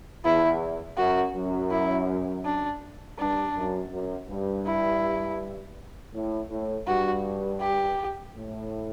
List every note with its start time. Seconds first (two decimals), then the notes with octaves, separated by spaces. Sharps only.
0.23 E2 E4
0.97 F#2 F#4
1.35 F#2
1.71 E4
2.45 D4
3.18 G2 D4
3.56 F#2
3.92 F#2
4.29 G2
4.66 E4
6.14 A2
6.50 A2
6.87 G2 F#4
7.61 G4
8.34 A2